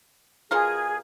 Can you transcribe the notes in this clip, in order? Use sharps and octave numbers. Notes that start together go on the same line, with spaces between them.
B2 F4 G#4 A#4